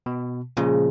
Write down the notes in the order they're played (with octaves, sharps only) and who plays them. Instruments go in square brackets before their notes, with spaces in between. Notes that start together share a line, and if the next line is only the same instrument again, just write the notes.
[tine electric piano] B2
[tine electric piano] A#2 C#3 F3 [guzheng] G#3